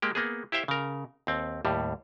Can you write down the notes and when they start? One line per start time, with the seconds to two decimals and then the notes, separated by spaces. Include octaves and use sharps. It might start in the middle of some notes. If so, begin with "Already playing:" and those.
0.02 G#3 A#3 G4
0.15 A#3 B3 G#4
0.52 E4 G4 C5 E5 F5 G5
0.68 C#3 A#4
1.27 D#2 C4
1.65 D#2 A2 G3